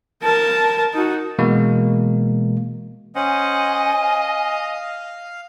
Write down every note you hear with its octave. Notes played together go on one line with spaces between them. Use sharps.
A#4 A5
D#4 F#4
B2 E3 G#3 A#3
C#4 C5 D#5 F#5 G#5
F5